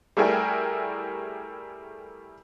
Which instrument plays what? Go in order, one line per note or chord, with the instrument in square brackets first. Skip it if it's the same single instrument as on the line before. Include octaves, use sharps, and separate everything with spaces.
[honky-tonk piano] G3 A3 E4 G#4 A#4 G5